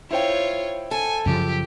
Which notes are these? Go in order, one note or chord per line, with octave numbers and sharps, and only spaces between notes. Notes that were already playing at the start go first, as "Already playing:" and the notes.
E4 F4 C5 C#5 G5
A4 G#5
F#2 C#3 F3 G4